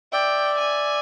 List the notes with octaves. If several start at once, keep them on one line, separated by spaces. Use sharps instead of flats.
D5 E5 G5
G#5